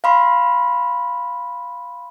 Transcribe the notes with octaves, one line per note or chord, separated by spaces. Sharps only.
F5 B5 C6